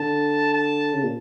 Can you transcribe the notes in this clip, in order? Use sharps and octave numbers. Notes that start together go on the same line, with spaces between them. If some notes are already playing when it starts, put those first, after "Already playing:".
Already playing: D3 A5
A5
C#3
A#2